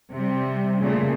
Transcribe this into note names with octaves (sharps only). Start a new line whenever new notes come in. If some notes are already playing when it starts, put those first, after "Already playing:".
C3 G3
A#2 C#3 A3